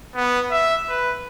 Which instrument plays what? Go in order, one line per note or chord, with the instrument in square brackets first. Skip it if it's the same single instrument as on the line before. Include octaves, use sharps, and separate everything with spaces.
[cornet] B3
E5
B4